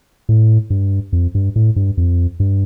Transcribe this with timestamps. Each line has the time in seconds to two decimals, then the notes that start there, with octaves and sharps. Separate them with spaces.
0.29 A2
0.70 G2
1.13 F2
1.35 G2
1.56 A2
1.76 G2
1.97 F2
2.40 G2